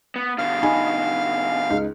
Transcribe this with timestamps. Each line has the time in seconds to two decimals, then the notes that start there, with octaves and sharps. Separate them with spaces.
0.16 B3
0.38 B2 D3 F5
0.63 D#4 G#5 B5
1.70 C#2 D#4